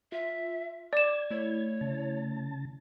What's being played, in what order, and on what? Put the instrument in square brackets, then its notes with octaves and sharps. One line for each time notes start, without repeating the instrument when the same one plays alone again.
[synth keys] F4 [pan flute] E5
[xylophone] D5 E7 [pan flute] D6 [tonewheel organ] G#6
[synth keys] A3 E4 [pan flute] C#5
[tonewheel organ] C#3 A5